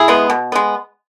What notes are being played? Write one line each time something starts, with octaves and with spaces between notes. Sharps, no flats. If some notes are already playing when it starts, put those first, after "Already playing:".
Already playing: E4 G#4
G#3 B3
B2
G#3 B3